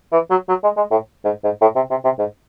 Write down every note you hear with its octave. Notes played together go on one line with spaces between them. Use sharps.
E3
F#3
F#3
G#3
G#3
A2
G#2
G#2
A2
C3
C3
C3
G#2